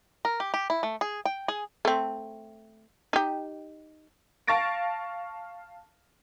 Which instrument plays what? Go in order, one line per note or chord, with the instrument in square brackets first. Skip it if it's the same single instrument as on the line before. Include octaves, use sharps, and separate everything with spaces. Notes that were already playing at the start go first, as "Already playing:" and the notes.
[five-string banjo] A#4
G4
G4
E4
A3
G#4
G5
G#4
[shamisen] A3 C4
D#4 G4
[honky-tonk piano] F5 A5 C#6 A6 A#6 D7